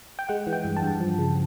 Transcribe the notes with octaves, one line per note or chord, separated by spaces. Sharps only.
G5
G#3 F#5
E3
G5
G2
A5
G2
F3
C#3